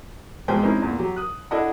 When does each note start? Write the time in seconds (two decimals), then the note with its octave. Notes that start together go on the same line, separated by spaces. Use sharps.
0.48 B1 F2 G#2 G#4 C5 G5
0.62 G#3 C4 C#4 D#4 E4
0.82 E2 A#2
0.99 F#3 G4
1.16 D#6 F#6
1.51 D4 E4 A4 D#5 F#5